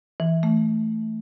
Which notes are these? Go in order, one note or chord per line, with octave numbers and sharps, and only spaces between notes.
E3
A3